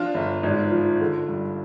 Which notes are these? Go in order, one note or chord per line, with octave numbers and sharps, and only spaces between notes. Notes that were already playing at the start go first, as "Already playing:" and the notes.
Already playing: F3 D4 F4
G1
G#1
F3
D3
G2